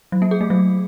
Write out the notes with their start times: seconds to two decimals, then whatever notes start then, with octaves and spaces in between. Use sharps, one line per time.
0.12 F#3
0.22 A#3
0.31 G#4
0.41 A3
0.50 F#3